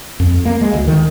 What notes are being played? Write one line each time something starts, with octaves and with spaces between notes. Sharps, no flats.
F2
A#3
G#3
D2
D#3